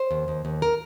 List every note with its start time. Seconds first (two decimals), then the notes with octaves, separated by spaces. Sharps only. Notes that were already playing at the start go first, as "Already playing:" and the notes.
Already playing: C5
0.11 D#2
0.28 D#2
0.45 D#2
0.62 A#4